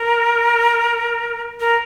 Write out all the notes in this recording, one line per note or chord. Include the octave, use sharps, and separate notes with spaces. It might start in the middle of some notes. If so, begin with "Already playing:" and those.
Already playing: A#4
A#4